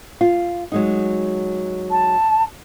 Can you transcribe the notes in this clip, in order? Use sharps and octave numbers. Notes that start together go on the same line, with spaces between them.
F4
F#3 G#3 D#4
A5